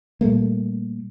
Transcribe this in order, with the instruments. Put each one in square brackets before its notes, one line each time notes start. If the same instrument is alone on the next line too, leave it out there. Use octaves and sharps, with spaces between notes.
[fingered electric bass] A#2 G3 A3 A#3